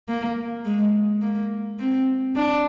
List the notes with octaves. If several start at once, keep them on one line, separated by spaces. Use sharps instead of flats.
A#3
G#3
A#3
C4
D4